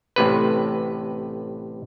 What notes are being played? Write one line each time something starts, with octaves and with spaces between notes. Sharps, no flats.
A1 A2 C3 B4